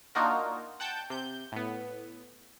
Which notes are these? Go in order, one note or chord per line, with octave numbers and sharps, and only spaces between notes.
A#3 D4 D#4 F4 F#4 A#4
F#5 G5 A5 G6
C3 G6
A2 B3